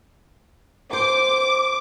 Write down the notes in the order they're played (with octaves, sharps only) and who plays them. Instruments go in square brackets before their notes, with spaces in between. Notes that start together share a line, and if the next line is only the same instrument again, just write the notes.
[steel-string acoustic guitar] C5 [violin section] D6